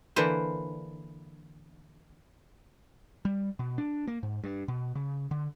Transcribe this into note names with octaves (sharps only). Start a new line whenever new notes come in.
D3 E3 A#3 B4 C5
G3
B2
D4
A#3
G#2
G2
B2
C#3
D3